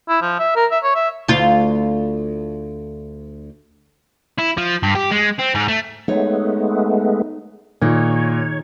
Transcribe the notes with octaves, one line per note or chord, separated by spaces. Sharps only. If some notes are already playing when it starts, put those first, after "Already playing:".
E4
F3
E5
A#4
E5
C#5
E5
D2 F4
E4
F3
G2
G4
G#3
C4
G#2
A3
G#3 A3 B3 D#4 C#5 D#5
A#2 D#3 D#4 G#4 C#5